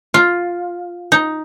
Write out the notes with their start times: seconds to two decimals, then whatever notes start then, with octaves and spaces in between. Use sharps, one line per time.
0.14 F4
1.12 D#4